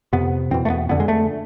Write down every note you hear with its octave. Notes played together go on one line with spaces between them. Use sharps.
F2 C3 B3
E2 B2 C4
A3
B3
F2 D3 B3
G#3
A3